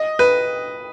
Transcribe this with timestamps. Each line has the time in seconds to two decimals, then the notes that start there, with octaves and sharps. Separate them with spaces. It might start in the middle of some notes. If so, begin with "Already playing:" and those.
Already playing: D#5
0.19 B4